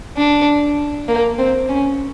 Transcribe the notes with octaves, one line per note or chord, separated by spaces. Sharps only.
D4
A#3
C4
C#4